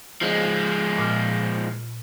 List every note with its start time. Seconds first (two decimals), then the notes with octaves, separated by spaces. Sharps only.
0.21 F3 G#3
0.98 A#2 F6